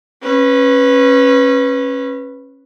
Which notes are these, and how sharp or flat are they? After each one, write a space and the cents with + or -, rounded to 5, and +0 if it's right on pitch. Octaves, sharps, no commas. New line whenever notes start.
C#4 -20 B4 +0